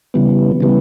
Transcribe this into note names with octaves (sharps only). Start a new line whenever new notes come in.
C#3 E3 G3 B3
C#3 E3 G3 B3